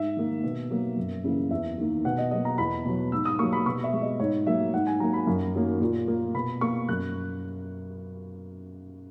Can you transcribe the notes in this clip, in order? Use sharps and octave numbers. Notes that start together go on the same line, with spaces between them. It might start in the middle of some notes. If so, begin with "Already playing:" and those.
Already playing: G#2 E5
D#3 A#3
B2
F#3 A#3
F#2
C#3 E3 A#3
E2 E5
D#3 A#3
B2 F#5
D#5
F#3 A#3 D#5
A#5
E2 B5
B2 F#3
G#2 E6
D#6
F#3 A#3 C#6
B5
B2 C#6
E5
G#3
D#5
G#2 C#5
F#3 A#3 E5
G#2 F#5
G#5
F#3 A#3 A#5
B5
F#2
D#3 F#3 A#3
A#2
A#3
B2 B5
A#3 C#6
F#2 F#6